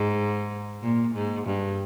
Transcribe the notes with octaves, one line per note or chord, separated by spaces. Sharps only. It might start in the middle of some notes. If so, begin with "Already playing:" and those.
Already playing: G#2
A#2
G#2
G2